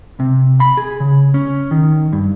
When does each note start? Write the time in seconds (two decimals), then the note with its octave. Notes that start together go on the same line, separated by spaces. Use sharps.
0.20 C3
0.60 B5
0.77 G#4
1.00 C#3
1.34 C#4
1.71 D#3
2.13 G2